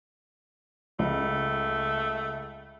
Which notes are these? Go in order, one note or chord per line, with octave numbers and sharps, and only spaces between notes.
C#2 A3